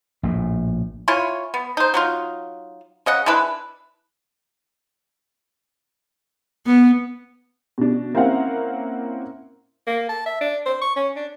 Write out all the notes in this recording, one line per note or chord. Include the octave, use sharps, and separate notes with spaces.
A#1 A2
E4 F4 C#5 G#5
B3
D#4 C5
F#3 D#4 F4
C#3 D#5 F#5
G#3 D4 E4 B4
B3
B2 D4
A#3 C4 C#4 E4 F5 F#5
A#3
A5
E5
D4
C5
C#6
C#4
D4